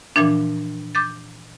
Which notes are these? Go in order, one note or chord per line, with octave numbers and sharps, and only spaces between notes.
A#2 E3 F3 D4
D6 G6 A6